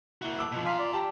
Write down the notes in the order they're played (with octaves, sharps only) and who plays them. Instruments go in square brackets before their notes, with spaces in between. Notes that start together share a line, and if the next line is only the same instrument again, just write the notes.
[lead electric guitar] A#3 F#4 [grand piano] E4 G7
[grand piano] A5 D6 E6
[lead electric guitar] B2 F3 [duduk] F4
[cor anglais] F5 [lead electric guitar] G#5 A#5 [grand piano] C6 D6 B6
[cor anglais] D5
[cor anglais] G4 [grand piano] A5